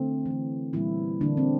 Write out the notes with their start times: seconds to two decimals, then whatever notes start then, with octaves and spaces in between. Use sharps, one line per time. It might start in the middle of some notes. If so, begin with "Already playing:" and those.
Already playing: D3 A3 C4
0.26 E3 A3
0.73 A#2 E3 G3 A#3 E4
1.21 D3 E3 A#3 D4
1.37 C4